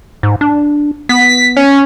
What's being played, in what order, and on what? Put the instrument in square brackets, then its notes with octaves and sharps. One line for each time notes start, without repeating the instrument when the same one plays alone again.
[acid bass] G#2
D4
[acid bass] B3 [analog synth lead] B6
[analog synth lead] C#4